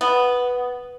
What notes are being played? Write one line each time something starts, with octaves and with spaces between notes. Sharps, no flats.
B3